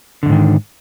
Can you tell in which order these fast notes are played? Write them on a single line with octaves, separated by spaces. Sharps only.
D3 E2 G#2 D#3